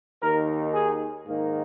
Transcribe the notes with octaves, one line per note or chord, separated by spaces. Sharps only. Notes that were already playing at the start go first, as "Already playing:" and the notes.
D#2 D#3 A#4
G#4
G#2 D#3 A#3